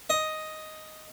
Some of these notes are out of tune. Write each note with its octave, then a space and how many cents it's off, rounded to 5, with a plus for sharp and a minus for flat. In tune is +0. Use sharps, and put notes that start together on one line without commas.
D#5 +5